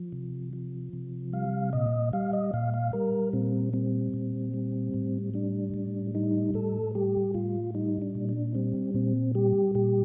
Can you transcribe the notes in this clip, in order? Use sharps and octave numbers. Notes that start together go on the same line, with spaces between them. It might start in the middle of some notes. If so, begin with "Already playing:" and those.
Already playing: F3
C3
F3
C3
G3 F5
A#2 D#5
G3 F5
D#5
A#2 F5
F5
G3 A#4
A#2 C4
G3 C4
A#2
G3
A2
G3 D4
A2
G3 D#4
A2 A4
G3 G4
A2 F4
G3 D#4
D4
A#2
D4
G3 C4
A#2 C4
G3 G4
A#2 G4